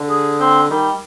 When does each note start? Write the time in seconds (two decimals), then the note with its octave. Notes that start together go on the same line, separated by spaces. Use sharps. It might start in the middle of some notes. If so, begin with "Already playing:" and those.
Already playing: D3
0.10 G#4
0.40 C4
0.70 D#3 G3